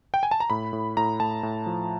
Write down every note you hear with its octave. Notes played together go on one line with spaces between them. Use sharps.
G5
G#5
A5
A#5
A2 B5
A2
A2 A#5
A2 A5
A2
F3